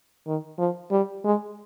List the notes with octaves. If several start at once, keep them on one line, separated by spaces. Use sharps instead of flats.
D#3
F3
G3
G#3